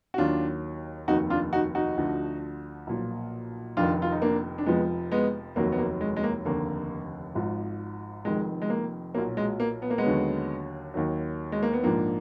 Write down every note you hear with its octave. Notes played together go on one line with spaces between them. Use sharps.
F#4
D#2 D#3 F#3 D4 F4
F1 D#2 D#3 D#4 F#4
D4 F4
D#4 F#4
D#4 F#4
D2 D3 F3
B1 A#2 F3
F1 F2 D#3 D4 F4
F4
D#4
A#3 D4
D4
F1 F2 F3 G#3 B3
G#3 B3
F1 D#2 D#3 F#3 A#3
B3
A#3
G#3
G#3
A#3
F1 D#2 D3 A#3
G#1 G#2 F3
F1 F2 D#3 G#3
G#3
A#3
B1 A#2 F#3 A#3
G#3
A#3
B3
A#3
G#3 B3
D#2 D3 F#3
D#2 D#3 F#3
G#3
A#3
B3
A#1 G#2 F3 A#3 D4